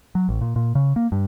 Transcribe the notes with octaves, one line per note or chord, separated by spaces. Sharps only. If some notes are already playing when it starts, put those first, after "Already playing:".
F#3
A1
A#2
A#2
C#3
A#3
G2